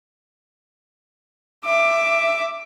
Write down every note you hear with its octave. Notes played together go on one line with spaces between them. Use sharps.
E5 D6